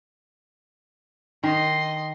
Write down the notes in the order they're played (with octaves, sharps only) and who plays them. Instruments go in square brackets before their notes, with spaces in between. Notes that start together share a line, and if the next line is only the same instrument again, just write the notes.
[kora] D#3 [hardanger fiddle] D#5 C6